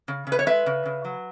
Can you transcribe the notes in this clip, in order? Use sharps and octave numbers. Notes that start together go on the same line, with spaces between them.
C#3
C#3
B4
C#5
G#3 B4 E5
C#3
C#3
F#3